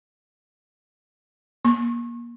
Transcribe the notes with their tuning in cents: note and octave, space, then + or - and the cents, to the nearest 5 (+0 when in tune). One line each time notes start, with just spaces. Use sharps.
A#3 +25 C#6 -35